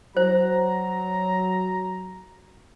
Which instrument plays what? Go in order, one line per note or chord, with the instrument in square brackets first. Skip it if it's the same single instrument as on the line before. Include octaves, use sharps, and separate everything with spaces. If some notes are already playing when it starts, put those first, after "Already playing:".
[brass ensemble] F#3 [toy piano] C5 [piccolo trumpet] A#5